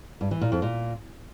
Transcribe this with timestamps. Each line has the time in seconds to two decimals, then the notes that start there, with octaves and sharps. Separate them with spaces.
0.21 G2
0.31 E3
0.41 A#2
0.52 F2
0.62 A#2